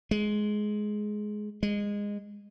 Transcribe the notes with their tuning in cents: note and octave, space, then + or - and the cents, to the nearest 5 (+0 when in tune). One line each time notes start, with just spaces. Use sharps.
G#3 +15
G#3 -20